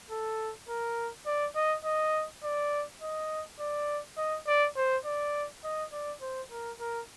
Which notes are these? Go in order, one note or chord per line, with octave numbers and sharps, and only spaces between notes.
A4
A#4
D5
D#5
D#5
D5
D#5
D5
D#5
D5
C5
D5
D#5
D5
C5
A#4
A#4